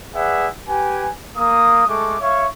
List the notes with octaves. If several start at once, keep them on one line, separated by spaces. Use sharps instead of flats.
G#4 B4 D5 E5 F#5
G4 B4 G#5
A#3 D#6
G#3 A3 A4 C#6 D6
C#5 E5 F5 C#6